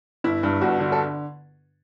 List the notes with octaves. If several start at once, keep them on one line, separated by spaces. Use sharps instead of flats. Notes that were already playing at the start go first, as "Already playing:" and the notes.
G1 E4
G2
G1 F#4
D3
A4